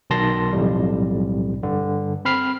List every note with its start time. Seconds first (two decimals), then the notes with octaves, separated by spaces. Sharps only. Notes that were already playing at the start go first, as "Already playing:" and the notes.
0.10 B1 B2 D#3 A5 C6 A#6
0.53 B1 F2 A2 G3
1.63 G2 D3
2.25 C4 B5 F6 C7